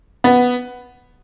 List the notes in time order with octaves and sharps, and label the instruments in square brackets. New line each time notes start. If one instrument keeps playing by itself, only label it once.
[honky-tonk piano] B3